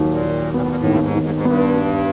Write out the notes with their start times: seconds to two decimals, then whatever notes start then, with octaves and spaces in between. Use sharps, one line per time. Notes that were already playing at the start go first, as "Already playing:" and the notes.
Already playing: D#2 F#3
0.09 A#2
0.23 D#3
0.54 A#2 B3
0.61 A2
0.68 A#2
0.77 A2
0.84 D#2
0.90 G2
0.99 G#2
1.15 D#3
1.23 G#2
1.35 G#2
1.45 G2 B3
1.76 B3